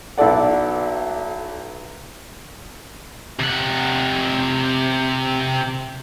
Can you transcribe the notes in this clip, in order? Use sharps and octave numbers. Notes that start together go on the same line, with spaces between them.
B1 E4 A4 D5 F#5
C3 F#5